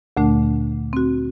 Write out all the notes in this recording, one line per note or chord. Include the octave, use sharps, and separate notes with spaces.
D2 A#2 D3 A3 D4
C4 F#4